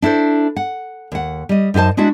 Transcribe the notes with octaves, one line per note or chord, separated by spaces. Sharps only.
D4 E4 A4 C5
F#5
D#2 F#5
G3 D#5
F#2 D#4 G4 C5 A5
G#3 D4 E4 F#4 E5